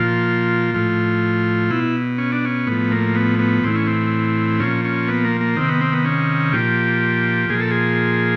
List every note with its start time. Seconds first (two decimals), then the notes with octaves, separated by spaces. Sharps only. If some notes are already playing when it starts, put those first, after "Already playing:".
Already playing: A#2 F3 F4
0.75 A2 F3
1.71 B2 E4
2.18 C#4
2.32 D4
2.45 C#4
2.67 A2 F3 B3
2.91 A#3
3.15 B3
3.39 B3
3.64 A2 E3 C4
3.75 C#4
3.87 C4
4.60 A#2 F3 C#4
4.85 C#4
5.08 B3
5.25 A#3
5.41 A#3
5.56 C3 D#3 C4
5.68 B3
5.81 C4
5.92 B3
6.05 C#4
6.53 A#2 F3 G4
7.50 A#2 F3 G#4
7.60 A4
7.71 G#4